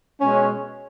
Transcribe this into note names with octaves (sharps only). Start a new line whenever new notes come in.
B2 G#3 C#4